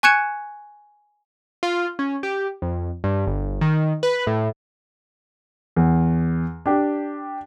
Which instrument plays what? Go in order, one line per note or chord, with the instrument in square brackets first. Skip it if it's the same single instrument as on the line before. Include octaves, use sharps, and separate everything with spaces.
[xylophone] G#5 C#6 F#6 G#6 C#7 E7
[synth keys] F4
C#4
G4
F2
G2
G1
D#3
B4
A2
[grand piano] E2
D4 G4